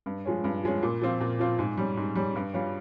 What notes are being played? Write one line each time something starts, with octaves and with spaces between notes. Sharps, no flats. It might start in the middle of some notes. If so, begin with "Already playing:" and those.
G2
F3 G#3 C#4
G2
F3 G#3 C#4
A#2
F3 C4 F4
A#2
F3 C4 F4
G#2
G3 C#4
G#2
G3 C#4
G2
G3 C#4 F4